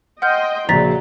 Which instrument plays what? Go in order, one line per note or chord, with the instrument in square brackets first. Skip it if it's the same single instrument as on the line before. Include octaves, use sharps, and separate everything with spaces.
[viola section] D#5 G5 C6 [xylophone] F#5 F6 G6
[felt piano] A#1 A#2 C#3 [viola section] F#3 [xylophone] A#5 A6 B6